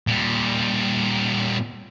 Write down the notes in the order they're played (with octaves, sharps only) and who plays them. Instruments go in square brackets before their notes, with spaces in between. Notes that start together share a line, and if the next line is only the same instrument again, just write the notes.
[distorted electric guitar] A#2 G3